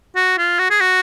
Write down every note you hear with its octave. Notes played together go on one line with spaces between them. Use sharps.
F#4
F4
F#4
G#4
F#4